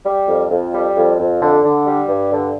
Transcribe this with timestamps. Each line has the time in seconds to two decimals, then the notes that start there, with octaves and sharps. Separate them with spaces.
0.06 G3
0.28 F2
0.51 F2
0.73 G3
0.96 F2
1.19 F2
1.41 D3
1.64 D3
1.86 G3
2.09 G2
2.31 D3